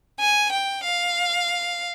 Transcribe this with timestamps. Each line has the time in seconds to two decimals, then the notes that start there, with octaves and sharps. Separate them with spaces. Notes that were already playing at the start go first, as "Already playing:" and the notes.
0.20 G#5
0.52 G5
0.84 F5